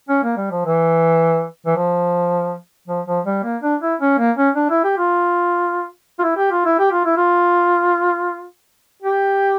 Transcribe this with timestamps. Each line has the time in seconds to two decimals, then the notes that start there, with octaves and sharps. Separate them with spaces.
0.09 C#4
0.23 A#3
0.37 G3
0.51 F3
0.66 E3
1.66 E3
1.77 F3
2.88 F3
3.07 F3
3.26 G3
3.44 A#3
3.63 D4
3.82 E4
4.00 C#4
4.18 A#3
4.37 C#4
4.56 D4
4.70 E4
4.84 G4
4.98 F4
6.19 F4
6.23 E4
6.37 G4
6.51 F4
6.65 E4
6.79 G4
6.91 F4
7.05 E4
7.17 F4
9.02 G4